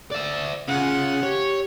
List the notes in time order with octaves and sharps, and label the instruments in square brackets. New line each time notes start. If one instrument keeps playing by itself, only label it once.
[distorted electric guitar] D5 E5
[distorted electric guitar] C#3 [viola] F4 F#5
[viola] G4 [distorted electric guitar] C#5